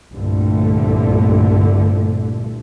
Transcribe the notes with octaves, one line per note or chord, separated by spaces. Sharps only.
C2 G2 A#2 D3 A3